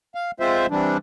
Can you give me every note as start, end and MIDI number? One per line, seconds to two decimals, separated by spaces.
0.15 0.31 77
0.40 0.67 56
0.40 0.67 60
0.40 0.67 65
0.40 0.67 72
0.40 0.67 76
0.70 0.97 48
0.70 0.97 52
0.70 0.97 55
0.70 0.97 62